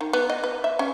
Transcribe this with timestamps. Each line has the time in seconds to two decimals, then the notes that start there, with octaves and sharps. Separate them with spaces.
0.01 D#3
0.13 B3
0.30 D#5
0.44 B4
0.64 E5
0.79 C#4